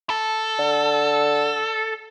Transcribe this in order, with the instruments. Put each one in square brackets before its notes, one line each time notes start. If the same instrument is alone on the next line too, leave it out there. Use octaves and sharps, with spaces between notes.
[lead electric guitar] A4
[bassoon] D3